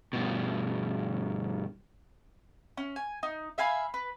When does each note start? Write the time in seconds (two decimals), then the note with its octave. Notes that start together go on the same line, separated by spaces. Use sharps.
0.13 G2 B2
2.77 C#4
2.96 G#5
3.23 D#4
3.58 E5 F5 G#5 B5
3.94 B4